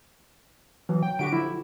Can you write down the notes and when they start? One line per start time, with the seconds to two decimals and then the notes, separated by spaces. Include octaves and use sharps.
0.89 E3 F#3
1.03 G5
1.19 D3 F#4 G4 D7
1.33 F3 E4